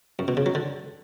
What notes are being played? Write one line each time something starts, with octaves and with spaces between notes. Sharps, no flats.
F#2
B2
C#3
F#3
D3